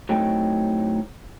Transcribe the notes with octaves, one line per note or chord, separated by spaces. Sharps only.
A2 F#3 A3 C4 D#4 G5